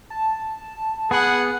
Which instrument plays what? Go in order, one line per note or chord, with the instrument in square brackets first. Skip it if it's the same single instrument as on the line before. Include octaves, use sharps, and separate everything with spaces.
[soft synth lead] A5
[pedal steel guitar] B3 B5 [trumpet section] G#4 F#5